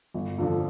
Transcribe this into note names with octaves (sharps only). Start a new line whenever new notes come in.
G1
F2 D3 F3